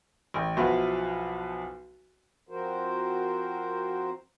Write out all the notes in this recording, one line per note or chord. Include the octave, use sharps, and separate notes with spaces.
A1 G5
B1 F3 E4 F#4 B4
F3 C4 F#4 A#4 C5